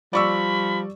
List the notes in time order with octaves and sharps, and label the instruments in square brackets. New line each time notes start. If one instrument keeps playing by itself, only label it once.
[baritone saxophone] F3 [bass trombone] G3 [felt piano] D5 C#6 E6 [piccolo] B5